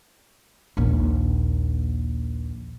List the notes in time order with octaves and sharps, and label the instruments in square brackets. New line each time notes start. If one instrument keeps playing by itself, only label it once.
[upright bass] A#1 D#2